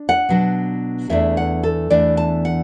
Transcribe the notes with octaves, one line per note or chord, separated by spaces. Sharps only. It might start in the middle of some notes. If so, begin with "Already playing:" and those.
Already playing: D4
F#5
B2 F#3 D4
E2 E3 A3 D4 E5
F#5
A4
E2 E3 A3 D4 D5
A5
F#5